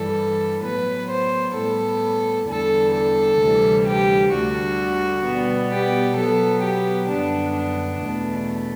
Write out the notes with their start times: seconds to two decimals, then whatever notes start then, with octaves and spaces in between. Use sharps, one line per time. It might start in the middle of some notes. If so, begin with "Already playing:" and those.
Already playing: G2 E3 G3 A4
0.64 A2 F#3 B3 B4
1.11 C5
1.56 A2 G3 B3 A4
2.49 E2 D3 G3 A4
2.95 A4
3.40 D2 C3 E3 G3
3.87 G4
4.33 D2 D3 G3 F#4
5.25 B2 G3 B3
5.71 G4
6.17 B2 F#3 B3 A4
6.63 G4
7.09 F#2 D3 G3 B3 D4
7.55 D4
8.02 E2 B2 A3